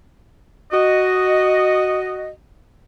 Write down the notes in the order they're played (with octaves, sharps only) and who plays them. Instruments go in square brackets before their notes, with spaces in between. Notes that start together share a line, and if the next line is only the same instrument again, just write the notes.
[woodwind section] F#4 D#5